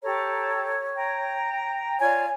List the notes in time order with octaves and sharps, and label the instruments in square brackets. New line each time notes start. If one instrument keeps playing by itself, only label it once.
[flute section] G4 A4 A#5 [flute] C#5
[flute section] G5 A#5
[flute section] F4 C#5 D5 [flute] G#5